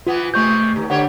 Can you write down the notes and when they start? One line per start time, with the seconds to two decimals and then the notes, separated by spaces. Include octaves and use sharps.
0.07 E3 B3 F4
0.34 C3 G#3 A3 C#6 G6
0.76 D#2
0.90 D3 G4 C#5 F#5